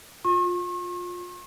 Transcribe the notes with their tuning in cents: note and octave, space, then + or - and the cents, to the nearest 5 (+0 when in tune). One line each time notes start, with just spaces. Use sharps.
F4 +20 C#6 -45